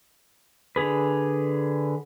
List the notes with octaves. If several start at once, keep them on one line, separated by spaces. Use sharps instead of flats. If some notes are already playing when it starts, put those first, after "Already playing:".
D3 G#4 B4